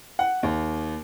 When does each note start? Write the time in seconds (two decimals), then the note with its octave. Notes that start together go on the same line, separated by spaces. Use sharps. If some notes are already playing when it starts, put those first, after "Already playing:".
0.19 F#5
0.43 D#2